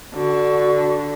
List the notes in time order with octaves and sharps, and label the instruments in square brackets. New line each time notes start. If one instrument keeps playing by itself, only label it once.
[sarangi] D3 [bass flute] F#4